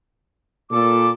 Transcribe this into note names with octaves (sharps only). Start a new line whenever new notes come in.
A#2 A4 D6